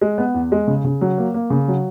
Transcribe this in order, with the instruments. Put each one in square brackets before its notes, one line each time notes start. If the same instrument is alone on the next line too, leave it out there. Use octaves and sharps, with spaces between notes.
[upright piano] G#3
B3
E2
G#3
C#3
C#3
F#3
A#3
A#3
C#3
F#3